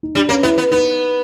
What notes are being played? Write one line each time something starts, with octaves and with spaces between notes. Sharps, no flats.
D#4
G3 D4
A#3 C#4
B3 E4
B3
B3 D#4